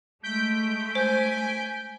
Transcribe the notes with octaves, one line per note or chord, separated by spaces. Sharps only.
G#3 A3 G6 B6 D7
C5 G#5